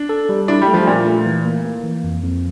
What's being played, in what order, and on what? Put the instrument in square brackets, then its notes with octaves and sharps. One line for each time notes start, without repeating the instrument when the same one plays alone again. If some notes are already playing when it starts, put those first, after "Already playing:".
Already playing: [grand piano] D4
[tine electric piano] A4
G3
[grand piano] D4 [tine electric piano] E4
[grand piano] G3
[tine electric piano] A3
[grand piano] F3
[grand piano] A#2 [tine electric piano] D5
[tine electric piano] A3
E3
A#3
A#3
E3
F2
F2